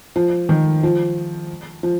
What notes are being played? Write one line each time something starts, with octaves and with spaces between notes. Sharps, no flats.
F3
D#3
F3
F3